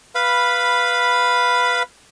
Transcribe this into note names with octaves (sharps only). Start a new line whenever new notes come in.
B4 F5 B5